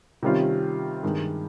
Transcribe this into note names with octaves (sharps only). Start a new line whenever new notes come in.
C3 D#3 G3 C#4 F4
G2 D#3 G#3